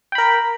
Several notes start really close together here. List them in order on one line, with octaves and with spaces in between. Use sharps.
G5 B5 A#4